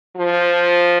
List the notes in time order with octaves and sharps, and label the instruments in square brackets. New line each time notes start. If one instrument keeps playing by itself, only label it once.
[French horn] F3